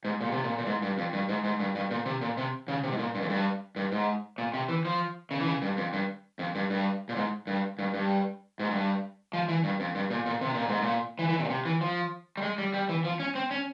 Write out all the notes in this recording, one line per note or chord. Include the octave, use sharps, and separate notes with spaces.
G#2
A#2
C3
A#2
A#2
G#2
G2
F2
G2
G#2
G#2
G2
G2
A#2
C3
A#2
C3
C#3
C3
G#2
A#2
G2
F2
G2
G2
G#2
A#2
C3
E3
F3
C#3
E3
C#3
G2
F2
G2
F2
G2
G2
A#2
G#2
G2
G2
G2
G#2
G2
F3
E3
G2
F2
G2
A#2
A#2
C3
A#2
G#2
A#2
E3
E3
C3
A#2
C3
E3
F3
G3
G#3
G3
G3
E3
F3
C#4
C4
C#4